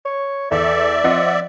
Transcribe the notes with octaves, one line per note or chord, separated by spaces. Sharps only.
C#5
E2 A4 D5 E5
F3 C4 D#5 F#5